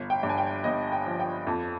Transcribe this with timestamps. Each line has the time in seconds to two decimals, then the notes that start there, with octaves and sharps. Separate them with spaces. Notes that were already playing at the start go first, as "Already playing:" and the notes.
Already playing: G1
0.10 G5
0.23 G2
0.29 G#5
0.38 G5
0.64 G1 D#5
0.92 G5
1.06 F3
1.20 G5
1.47 F2